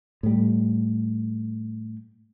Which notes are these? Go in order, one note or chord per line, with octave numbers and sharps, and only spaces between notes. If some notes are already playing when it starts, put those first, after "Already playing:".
A2 G3